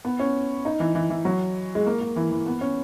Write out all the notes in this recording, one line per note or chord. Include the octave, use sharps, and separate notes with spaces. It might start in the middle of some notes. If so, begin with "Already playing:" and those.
B3
C#4
D#4
E3
E3
E3
F#3
G#3
A#3
A#3
E3
E3
B3
C#4